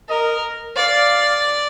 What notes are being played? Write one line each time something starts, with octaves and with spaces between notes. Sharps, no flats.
A#4 D#5
D5 F5